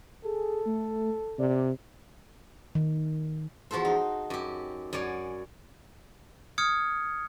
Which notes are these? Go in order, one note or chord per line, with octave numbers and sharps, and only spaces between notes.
G#4 A4
A3
C3 D5
D#3
E2 F3 F#4 A4 C5
D#4
F#2 G4
F#2 C#5 D5 G#5
D#6 F6 G#6 C#7